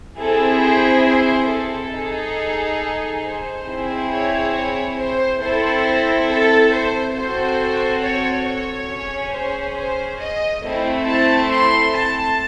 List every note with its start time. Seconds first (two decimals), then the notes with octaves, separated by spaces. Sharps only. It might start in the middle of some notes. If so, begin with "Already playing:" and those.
0.19 C4 E4 G#4 A4
0.63 C5
1.06 C5
1.49 A4
1.93 D#4 G#4
3.24 C5
3.67 C4 E4 G#4
4.11 C#5
4.54 C#5
4.98 C5
5.41 C4 E4 A4 C5
6.28 A4
6.72 C5
7.15 C4 F#4 A4 C5
8.02 C#5
8.46 C#5
8.89 C#4 G#4
9.33 C5
9.76 C5
10.19 D#5
10.63 A3 C4 E4
11.07 A5
11.51 C6
11.94 A5